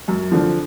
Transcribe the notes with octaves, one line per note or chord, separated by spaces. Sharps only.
F#2
D3 F3